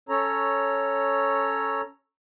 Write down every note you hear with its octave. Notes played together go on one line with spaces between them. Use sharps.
C#4 A4 C#5 A#5